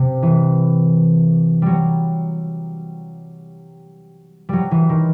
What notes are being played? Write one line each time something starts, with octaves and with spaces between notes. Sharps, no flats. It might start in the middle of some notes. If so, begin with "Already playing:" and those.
Already playing: C3
E3
F#3 G3
F#3 G3
E3
D#3